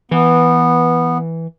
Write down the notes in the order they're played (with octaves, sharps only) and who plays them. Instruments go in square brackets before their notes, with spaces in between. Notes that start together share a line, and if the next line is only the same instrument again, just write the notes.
[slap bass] E3 [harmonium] B3